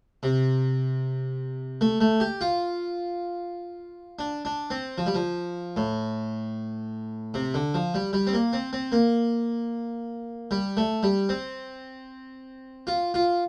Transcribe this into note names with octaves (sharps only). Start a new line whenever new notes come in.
C3
A3
A3
G4
F4
D4
D4
C4
F3
G3
F3
A2
C3
D3
F3
G3
G3
C4
A#3
C4
C4
A#3
G3
A3
G3
C4
F4
F4